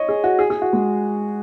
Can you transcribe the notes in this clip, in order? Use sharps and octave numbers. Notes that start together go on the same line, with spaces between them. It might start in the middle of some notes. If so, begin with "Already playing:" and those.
Already playing: C#5 D#5
G#4
F#4
G#4
G#4
F#4
G#3